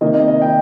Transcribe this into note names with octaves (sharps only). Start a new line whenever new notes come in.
C3 D#3 A#3 D#5
D#5
D#5
G5